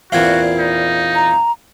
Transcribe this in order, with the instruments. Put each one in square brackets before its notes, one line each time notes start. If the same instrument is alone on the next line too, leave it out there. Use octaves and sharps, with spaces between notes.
[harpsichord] E2 A#2 C4 [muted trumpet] F#4 [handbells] F5 G#6
[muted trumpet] D#4
[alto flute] A#5